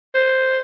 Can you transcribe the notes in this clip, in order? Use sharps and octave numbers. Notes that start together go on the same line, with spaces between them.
C5